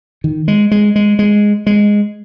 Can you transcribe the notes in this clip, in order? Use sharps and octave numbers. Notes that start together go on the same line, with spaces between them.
D#3
G#3
G#3
G#3
G#3
G#3